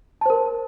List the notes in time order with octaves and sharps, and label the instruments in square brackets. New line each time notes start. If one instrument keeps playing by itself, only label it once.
[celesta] A5
C5
A#4